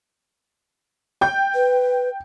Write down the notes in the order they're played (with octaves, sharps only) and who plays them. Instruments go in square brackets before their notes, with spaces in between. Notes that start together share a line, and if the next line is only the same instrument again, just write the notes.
[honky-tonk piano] G5 G6
[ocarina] B4